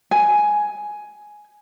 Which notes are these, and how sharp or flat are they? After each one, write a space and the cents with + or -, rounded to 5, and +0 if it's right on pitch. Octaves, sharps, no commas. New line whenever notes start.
G#5 +5